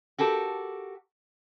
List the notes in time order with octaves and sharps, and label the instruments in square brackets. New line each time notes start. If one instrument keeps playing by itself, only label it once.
[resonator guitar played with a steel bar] F#4 G4 A4 A#4